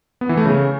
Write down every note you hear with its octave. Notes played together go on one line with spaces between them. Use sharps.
B3
E3
A3
C#3